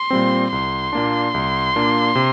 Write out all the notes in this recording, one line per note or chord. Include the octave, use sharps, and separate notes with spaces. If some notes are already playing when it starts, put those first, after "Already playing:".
Already playing: C6
A#2 G3 C4
C2 C6
A#2 A#3 D4
C2
A#2 A#3 D4
C3